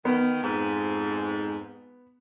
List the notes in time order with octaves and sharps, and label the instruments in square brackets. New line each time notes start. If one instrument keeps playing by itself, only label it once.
[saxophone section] D#3 [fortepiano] B3
[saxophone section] F2 G#2